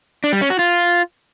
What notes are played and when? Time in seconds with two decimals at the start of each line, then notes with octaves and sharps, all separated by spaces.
0.24 D4
0.33 G3
0.41 C#4
0.50 F#4
0.59 F4